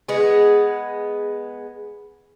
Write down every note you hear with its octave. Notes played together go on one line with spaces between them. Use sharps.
G#3 B3 G#4